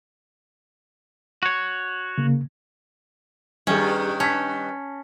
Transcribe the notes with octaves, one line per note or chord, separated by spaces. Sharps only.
F#4 C#5
C#3 A#3
G2 D#3 G3 C#4 G#4
C#4 A5 B6